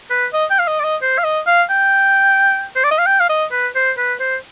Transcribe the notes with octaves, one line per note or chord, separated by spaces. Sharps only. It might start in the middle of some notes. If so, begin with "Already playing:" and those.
B4
D#5
G5
F5
D#5
D5
D#5
C5
F5
D#5
F5
G5
C5
D5
D#5
F5
G5
F5
D#5
B4
C5
B4
C5